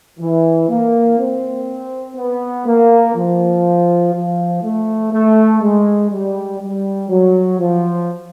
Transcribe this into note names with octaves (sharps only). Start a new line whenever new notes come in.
E3
A#3
C4
B3
A#3
F3
F3
A3
A3
G#3
G3
G3
F#3
F3